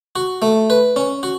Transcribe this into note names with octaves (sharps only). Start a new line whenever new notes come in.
F#4
A3
B4
C#4
F#4